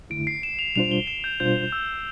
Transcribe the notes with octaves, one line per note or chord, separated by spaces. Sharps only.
F2 D3 A3 E4 D7
C7
E7
F7
B2 G3 D4 F4 C5 F7
G7
E7
G6
B2 G3 D4 F4 C5 G6
E6